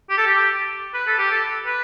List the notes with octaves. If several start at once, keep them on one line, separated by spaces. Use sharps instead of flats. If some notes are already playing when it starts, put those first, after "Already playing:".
G4
A4
G4
B4
A4
G4
A4
B4